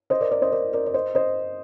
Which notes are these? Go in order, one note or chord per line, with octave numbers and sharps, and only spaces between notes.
C5 D#5
A#4 D5
A#4 D5
C5 D#5
A#4 D5
A#4 D5
D5
C5 D#5
C5 D#5